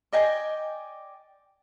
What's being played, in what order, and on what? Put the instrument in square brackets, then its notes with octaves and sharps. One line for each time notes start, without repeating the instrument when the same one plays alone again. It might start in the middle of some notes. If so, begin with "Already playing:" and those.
[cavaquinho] D5 D#5 G5 G#5